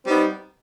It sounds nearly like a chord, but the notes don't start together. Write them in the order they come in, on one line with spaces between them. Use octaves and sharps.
C4 G3 D#4 B3